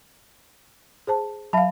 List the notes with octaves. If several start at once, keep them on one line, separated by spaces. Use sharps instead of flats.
G#4 C5 A5
F#3 E5 F5 A5 B5